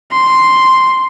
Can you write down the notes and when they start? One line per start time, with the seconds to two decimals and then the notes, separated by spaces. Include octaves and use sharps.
0.12 C6